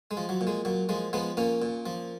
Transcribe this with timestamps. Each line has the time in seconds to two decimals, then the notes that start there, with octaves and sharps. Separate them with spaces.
0.11 G#3
0.17 F3
0.29 F#3
0.41 A#2
0.47 G#3
0.65 A#2 F#3
0.89 F3 G#3
1.13 F3 G#3 B3
1.37 A#2 A#3 C#4
1.62 A#2
1.86 F3